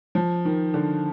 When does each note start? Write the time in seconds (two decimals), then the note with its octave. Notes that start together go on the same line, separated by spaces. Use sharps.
0.15 F3
0.45 D#3
0.74 D3